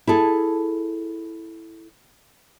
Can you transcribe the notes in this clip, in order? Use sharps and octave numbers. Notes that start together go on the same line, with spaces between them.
E4 G#4 A4